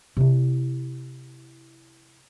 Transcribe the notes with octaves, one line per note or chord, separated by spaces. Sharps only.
C3 E4